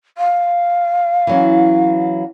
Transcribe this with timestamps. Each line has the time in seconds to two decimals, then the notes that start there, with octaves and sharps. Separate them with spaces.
0.18 F5
1.27 E3 F#3 C#4